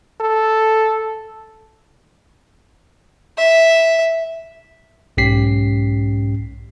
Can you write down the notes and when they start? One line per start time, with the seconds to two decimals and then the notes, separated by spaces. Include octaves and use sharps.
0.20 A4
3.38 E5
5.17 B1 G#2 C#4 G4 B6 C7